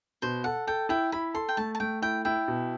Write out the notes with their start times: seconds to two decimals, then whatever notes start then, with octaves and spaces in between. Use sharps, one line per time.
0.22 B2 C5
0.44 A4 F#5
0.67 A4 G5
0.89 E4 G5
1.12 E4 B5
1.34 A4 C6
1.49 G5
1.57 A3 A5
1.75 A5
1.80 A3 G5
2.02 E4 G5
2.25 E4 G5
2.48 B2